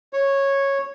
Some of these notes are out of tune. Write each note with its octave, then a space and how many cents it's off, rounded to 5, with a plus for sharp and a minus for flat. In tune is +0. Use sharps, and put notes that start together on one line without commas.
C#5 -10